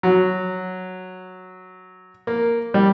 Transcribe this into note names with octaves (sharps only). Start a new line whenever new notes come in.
F#3
A#3
G3